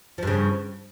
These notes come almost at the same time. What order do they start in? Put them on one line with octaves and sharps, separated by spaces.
F3 G2 C#3